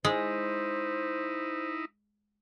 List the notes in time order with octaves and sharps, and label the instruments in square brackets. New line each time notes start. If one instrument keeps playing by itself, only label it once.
[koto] G#3 [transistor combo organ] D#4 E4 [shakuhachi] C5